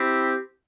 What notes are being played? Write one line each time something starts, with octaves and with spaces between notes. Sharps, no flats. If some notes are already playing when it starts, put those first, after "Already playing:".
Already playing: C4 E4 G4